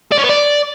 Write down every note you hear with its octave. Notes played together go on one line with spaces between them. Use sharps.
D5
C#4
B3
D5